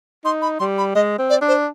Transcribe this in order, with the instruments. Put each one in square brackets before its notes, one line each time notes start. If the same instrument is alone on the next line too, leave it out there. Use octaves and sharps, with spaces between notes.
[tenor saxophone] D#4 [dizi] C6
[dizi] B5
[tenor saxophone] G3 [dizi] C6
[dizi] B5
[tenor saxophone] G#3 [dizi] D#5
[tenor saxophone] C4
[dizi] D5
[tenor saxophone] D4
[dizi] C5